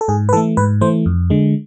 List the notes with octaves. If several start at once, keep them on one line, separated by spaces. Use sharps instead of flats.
A4
G#2 G#4
B4
E3 A3 A4
G#2 B4
E3 A3 C5
F2
D3 G#3